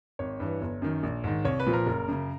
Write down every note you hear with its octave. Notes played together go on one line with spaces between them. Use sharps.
G#1 C#5
G2 E3
G1
F#2 D#3
A#1
G#2 D#3
C2 C#5
B4
A#2 F3
A#4
F#1
F#2 C#3